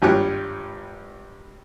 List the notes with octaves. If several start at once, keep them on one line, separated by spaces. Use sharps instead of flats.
G#1 G2 F4 G4 C#5 F#6